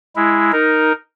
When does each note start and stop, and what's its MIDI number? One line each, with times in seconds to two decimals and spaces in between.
0.16 0.51 56
0.16 0.51 64
0.52 0.92 63
0.52 0.92 70